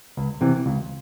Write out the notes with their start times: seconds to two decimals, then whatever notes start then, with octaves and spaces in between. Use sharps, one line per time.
0.17 C#2
0.41 C3 E3
0.66 C#2